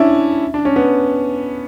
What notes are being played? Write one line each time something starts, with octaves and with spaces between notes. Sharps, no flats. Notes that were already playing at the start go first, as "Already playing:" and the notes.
Already playing: C#4 D4 E4
D4
C#4
B3